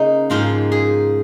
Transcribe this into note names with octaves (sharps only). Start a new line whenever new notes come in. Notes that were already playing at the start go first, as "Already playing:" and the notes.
Already playing: C#3 A#3 D#4
G#2 F3 A#3 F4
G#4